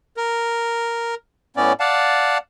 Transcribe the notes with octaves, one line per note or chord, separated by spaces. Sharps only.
A#4
A2 B3 C#4 D5
D5 F5 F#5 A5